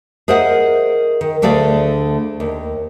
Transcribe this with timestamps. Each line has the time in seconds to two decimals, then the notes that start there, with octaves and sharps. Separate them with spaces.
0.28 G#4 A#4 C5 D#5 E5 F#5
1.21 D#3
1.42 D2 D3 A3 G#4 D5 F5
2.40 D#2